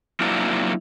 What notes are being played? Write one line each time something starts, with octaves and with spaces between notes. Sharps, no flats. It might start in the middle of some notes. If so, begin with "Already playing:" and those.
F#3 A#3 C4 D4 E4 F4